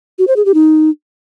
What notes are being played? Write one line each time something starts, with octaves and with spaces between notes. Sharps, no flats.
F#4
C5
G#4
G4
D#4